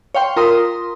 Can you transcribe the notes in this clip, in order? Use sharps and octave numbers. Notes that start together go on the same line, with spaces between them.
C#5 F5 G5 C6
F4 A#4 A#5 C6 D#6